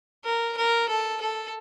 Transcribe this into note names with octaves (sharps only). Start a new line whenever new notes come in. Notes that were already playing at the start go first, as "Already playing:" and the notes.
A#4
A#4
A4
A4